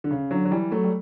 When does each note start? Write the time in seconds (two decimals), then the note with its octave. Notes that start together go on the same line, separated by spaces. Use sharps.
0.04 D3
0.11 C#3
0.31 D3 F#3
0.45 F#3
0.51 E3 G3
0.71 F#3 A3
0.84 G3